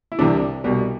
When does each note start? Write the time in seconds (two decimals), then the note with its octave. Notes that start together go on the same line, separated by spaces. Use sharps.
0.12 E4
0.19 C2 C3 E3 G3 D4
0.64 C2 B2 G3